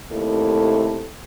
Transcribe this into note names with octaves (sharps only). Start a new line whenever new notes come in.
D#2 C3 A3 E4 A4